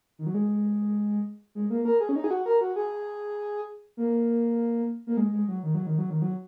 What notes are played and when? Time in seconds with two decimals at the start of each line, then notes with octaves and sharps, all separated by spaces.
0.19 D#3
0.27 F#3
0.34 G#3
1.55 G#3
1.70 A#3
1.85 A#4
2.00 G#4
2.09 C#4
2.16 D#4
2.24 G#4
2.31 F#4
2.46 A#4
2.61 F#4
2.76 G#4
3.97 A#3
5.07 A#3
5.17 G#3
5.32 G#3
5.48 F#3
5.63 D#3
5.75 F#3
5.87 D#3
5.98 F#3
6.10 D#3
6.22 F#3